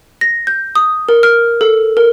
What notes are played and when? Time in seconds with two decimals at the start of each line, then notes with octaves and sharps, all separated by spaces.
0.21 A#6
0.47 G6
0.75 D#6
1.09 A#4
1.23 F6
1.61 A4
1.97 A#4